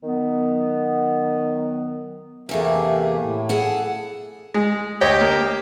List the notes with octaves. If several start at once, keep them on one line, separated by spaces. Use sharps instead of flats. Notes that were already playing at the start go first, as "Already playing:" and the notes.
D#3 F#3 B3
E2 C3 E3 A3 A#3 G#4
A2
G#4 A4 F#5
G#3
D2 G4 C#5 D#5
A#3